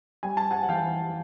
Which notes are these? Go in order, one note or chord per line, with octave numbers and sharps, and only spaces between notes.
G3 G#5
A5
F#5 G#5
F#5
E3 F5 G5